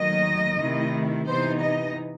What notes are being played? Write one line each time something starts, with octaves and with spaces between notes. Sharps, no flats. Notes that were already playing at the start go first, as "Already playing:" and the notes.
Already playing: D#2 D#3 F#3 A3 D#5
C3 D#3 A3 E4
C3 E3 B3 D#4 C5
D#5